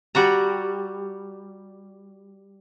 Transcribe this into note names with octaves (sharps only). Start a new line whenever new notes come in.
G3 F#4 A#5